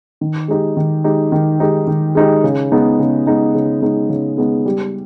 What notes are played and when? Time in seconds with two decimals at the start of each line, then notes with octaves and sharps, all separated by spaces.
0.21 D#3
0.48 G#3 D#4 G4
0.77 D#3
1.04 G#3 D#4 G4
1.32 D#3
1.60 G#3 D#4 G4
1.87 D#3
2.15 G#3 D#4 G4
2.44 C#3
2.72 G#3 B3 D#4
2.99 C#3
3.26 G#3 B3 D#4
3.55 C#3
3.82 G#3 B3 D#4
4.09 C#3
4.37 G#3 B3 D#4
4.66 G3